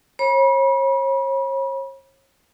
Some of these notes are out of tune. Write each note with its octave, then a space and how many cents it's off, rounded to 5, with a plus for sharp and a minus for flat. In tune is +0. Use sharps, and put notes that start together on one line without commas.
C#5 -40 B5 -35